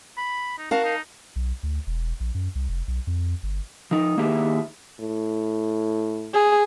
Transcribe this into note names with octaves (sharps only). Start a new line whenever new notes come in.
B5
D#4
F#4 A#4 F5 A5
D#4
B1
D2
E1
A#1
F#2
C2
F1
B1
F2
G1
F3 D#4
D#3 A#3 D#4 E4 G4 G#4
A2
G#4